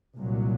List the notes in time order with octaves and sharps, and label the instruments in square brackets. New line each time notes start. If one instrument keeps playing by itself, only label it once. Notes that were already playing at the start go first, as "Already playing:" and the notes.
[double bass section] C2 A#2 F#3